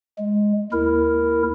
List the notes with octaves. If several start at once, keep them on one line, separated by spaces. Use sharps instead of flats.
G#3
D#2 E4 A#4